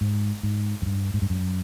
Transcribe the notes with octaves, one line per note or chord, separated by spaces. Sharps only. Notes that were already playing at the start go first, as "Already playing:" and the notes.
G#2
G#2
F#2
G2
G#2
G2
F#2